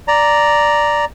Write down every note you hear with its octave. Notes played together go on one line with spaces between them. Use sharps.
D5 A#5